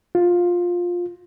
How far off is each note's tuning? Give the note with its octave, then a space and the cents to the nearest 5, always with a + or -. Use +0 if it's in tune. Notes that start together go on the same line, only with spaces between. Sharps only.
F4 +10